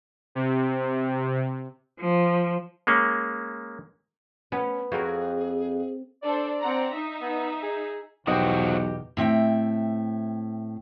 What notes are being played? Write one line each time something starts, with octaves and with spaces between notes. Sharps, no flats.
C3
F3
G#3 A#3 C#4
B3 C#4
F2 F#4 G#4 A#4 C#5
D4 A4 C5 D5
C4 F#5 A#5
D#4 E5
B3
G#4
B1 E2 B2 F3 F#4 G4 D#5
A2 C4 E5 G5